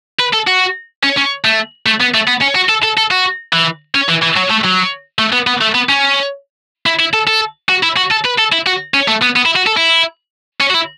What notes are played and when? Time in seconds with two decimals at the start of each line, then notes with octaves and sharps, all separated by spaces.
0.20 B4
0.33 A4
0.47 F#4
1.03 C#4
1.17 C#4
1.44 A3
1.86 A3
2.00 B3
2.14 A3
2.28 B3
2.42 C#4
2.55 F#4
2.69 A4
2.83 A4
2.98 A4
3.11 F#4
3.53 E3
3.95 C#4
4.09 E3
4.22 E3
4.36 F#3
4.50 A3
4.64 F#3
5.19 A3
5.33 B3
5.47 B3
5.61 A3
5.75 B3
5.89 C#4
6.86 E4
6.99 E4
7.13 A4
7.27 A4
7.69 F#4
7.83 E4
7.97 F#4
8.11 A4
8.25 B4
8.38 A4
8.52 E4
8.67 F#4
8.94 C#4
9.08 A3
9.22 B3
9.36 B3
9.46 E4
9.56 F#4
9.67 A4
9.77 E4
10.60 C#4
10.70 F#4
10.74 E4